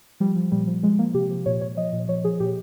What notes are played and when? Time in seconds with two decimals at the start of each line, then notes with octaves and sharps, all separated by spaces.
0.20 F3 G3
0.36 F3
0.52 A#2 G3
0.67 F3
0.83 F3 G#3
0.99 F3 A#3
1.14 C3 G4
1.30 F3
1.46 A#2 C#5
1.61 A#2 C#5
1.77 F3 D#5
1.93 A#2
2.09 F3 C#5
2.24 F3 G#4
2.40 A#2 G4